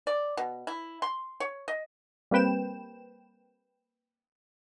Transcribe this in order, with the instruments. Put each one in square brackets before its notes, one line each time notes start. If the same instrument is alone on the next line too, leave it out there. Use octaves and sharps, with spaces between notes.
[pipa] D5
B2
E4
C6
C#5
D#5
[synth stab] G3 A#3 C4 B4 G5 E7